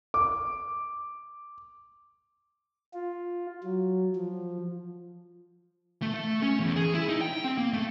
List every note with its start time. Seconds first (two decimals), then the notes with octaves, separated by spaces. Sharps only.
0.14 D6
2.94 F4
3.63 F#3
4.16 F3
6.02 A3
6.14 A3
6.43 C#4
6.60 E2
6.76 G#4
6.95 E4
7.09 D#4
7.21 G5
7.44 C4
7.58 A#3
7.73 A3